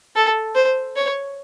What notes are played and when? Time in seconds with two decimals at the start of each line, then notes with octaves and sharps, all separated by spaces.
0.16 A4
0.55 C5
0.96 C#5